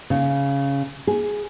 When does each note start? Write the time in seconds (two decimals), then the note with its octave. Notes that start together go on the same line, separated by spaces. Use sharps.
0.10 C#3
1.07 G#4